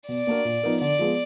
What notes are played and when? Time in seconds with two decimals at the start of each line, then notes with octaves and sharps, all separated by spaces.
0.08 B2 D5
0.27 A#3 D4 F#4 A#4
0.45 A#2
0.63 F3 B3 D#4 A#4
0.81 D3 D5
0.99 F3 G#3 B3